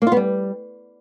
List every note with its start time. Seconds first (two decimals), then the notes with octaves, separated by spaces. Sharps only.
0.02 A#3
0.07 F4
0.12 B3
0.17 G3